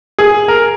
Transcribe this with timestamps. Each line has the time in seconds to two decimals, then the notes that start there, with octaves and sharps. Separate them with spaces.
0.19 G#4
0.48 A#4